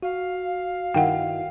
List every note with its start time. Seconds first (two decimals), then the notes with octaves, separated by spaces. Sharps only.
0.03 F#4 F5
0.94 G2 D#3 E4 F#5 G5